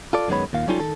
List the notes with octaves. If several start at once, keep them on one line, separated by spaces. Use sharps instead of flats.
F4 A4 D5
F#2 D#3 G#3 B3 C#5 B5
D#2 A#2 F5
F#3 G3 C#4 D#4 F4 A4
D#3 A4